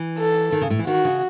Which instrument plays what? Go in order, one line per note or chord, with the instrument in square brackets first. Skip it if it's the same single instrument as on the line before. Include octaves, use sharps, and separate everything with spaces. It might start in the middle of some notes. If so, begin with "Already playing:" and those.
Already playing: [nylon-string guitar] E3
[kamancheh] A4
[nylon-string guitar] D#3
C#3
A2
E3
[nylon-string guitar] D#3 [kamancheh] F#4
[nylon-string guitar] C#3